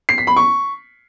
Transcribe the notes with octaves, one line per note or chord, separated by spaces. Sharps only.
C7
B6
B5
C#6